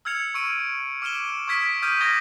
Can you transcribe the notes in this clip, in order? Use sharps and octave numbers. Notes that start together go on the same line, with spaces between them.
E6 F6 G#6 C#7 F7
C#6 E6 D7 D#7
D6 F6 D7 E7 G7
C#6 D#6 F6 G#6 B6 D7
D#6 F6 G6 G#6 D#7
D6 D#6 F6 G#6 A#6 G7